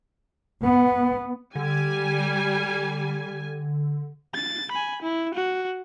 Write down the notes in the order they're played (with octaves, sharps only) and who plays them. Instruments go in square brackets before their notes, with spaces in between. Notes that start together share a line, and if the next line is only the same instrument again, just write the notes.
[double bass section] B3
[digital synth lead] D3 [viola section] G3 G#5
[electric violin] A6
G#5 B5
E4
F#4